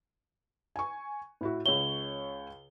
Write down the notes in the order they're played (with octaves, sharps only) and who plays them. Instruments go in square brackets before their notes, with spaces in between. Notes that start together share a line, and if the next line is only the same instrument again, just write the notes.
[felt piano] G#5 C#6
A2 E4 F#4
[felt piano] C#2 C#5 [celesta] G7